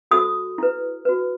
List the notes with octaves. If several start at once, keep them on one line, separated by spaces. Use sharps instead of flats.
F#4 A4 C5 D#6
E4 B4
F#4 B4